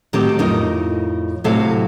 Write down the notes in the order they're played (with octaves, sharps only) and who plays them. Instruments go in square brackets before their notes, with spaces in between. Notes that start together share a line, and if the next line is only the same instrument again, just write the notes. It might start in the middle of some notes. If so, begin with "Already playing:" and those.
[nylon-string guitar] A2 D#3 F#3 C4 G4 A4
F2 A2 D#4 A#4 D#5
A2 C3 F#3 A4 F5